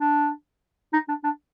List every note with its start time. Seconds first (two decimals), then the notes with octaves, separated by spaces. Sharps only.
0.01 D4
0.93 D#4
1.09 D4
1.24 D4